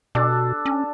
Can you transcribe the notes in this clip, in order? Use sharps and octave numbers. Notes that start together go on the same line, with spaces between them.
B2 D4 A4
C#4